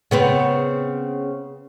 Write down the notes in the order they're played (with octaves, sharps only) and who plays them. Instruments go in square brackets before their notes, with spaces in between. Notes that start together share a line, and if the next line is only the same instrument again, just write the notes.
[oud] C#3 B3 C4